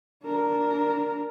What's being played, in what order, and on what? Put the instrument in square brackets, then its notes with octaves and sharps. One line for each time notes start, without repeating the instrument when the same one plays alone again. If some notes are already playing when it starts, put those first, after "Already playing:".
[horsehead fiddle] D4 A#4